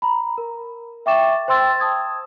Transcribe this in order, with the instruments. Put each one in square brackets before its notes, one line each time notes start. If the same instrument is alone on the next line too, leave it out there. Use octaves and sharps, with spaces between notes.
[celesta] A#5 B5
A#4
E5 G5 C#6 D6 A6 E7
C5 G5 C6 E6 A6
A5 D#6 G#6